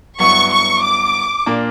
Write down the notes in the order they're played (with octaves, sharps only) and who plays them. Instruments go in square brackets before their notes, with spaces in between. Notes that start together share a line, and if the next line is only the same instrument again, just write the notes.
[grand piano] G2 F#3 B3 E4 [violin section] C#6
[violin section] C#6
D6
[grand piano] A#2 A#3 D4